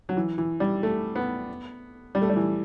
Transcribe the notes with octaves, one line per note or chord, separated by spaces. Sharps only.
F#3
E3
E3
G3
A3
B3
G3
A3
G3
E3